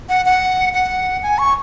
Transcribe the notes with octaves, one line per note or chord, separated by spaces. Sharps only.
F#5
F#5
F#5
G#5
C#6